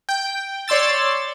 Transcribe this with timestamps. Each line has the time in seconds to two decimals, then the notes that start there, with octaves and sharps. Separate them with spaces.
0.09 G5
0.68 C#5 D5 C6 E6 A6